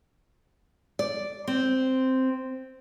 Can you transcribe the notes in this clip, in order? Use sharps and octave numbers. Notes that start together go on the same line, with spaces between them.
D5
C4